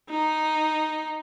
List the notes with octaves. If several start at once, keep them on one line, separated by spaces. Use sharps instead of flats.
D#4